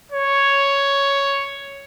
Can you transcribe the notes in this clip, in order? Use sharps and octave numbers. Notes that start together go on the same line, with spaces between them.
C#5